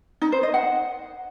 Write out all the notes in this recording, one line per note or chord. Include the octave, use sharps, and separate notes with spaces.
D#4
C5
D#5
F#5